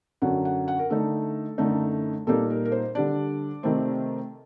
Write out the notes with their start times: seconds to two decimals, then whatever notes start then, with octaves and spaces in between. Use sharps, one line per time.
0.22 F#2 D3 F#3 F#5
0.45 F#5
0.68 F#5
0.79 A#4
0.90 D3 A3 D#4 A4
1.58 F#2 D3 A3 D#4
2.27 A#2 G3 A#3 D#4 A4
2.50 A#4
2.65 A#4
2.72 C5
2.95 D3 G3 D4 D5
3.63 C3 D#3 A3 C4